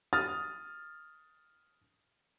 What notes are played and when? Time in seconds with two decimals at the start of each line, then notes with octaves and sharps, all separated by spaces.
0.13 D#6 F6 A6